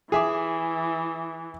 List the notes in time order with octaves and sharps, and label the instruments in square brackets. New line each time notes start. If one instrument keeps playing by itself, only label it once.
[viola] E3 [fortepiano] G#4 E5 D6